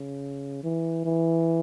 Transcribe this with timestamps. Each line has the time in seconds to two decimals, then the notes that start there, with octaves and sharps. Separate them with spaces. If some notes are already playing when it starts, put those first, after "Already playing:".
Already playing: C#3
0.63 E3
1.05 E3